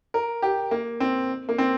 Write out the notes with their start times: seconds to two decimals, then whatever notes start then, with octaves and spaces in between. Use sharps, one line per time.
0.14 A#4
0.42 G4
0.71 A#3
1.00 C4
1.49 A#3
1.58 C4